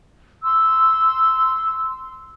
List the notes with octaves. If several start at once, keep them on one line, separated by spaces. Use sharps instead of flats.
C6 E6